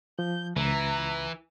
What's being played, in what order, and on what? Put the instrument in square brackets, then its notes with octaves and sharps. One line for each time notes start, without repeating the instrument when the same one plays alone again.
[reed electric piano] F3 [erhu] G6
[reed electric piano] C#2 [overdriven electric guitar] E3 [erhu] A#5